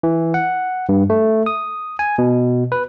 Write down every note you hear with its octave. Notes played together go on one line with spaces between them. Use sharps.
E3
F#5
G2
A3
D#6
G#5
B2
B4